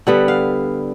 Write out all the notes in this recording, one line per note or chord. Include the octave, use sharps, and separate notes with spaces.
D3 G3 B3 F#5
F5